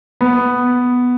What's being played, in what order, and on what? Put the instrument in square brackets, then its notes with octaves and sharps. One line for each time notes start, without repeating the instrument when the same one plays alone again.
[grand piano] B3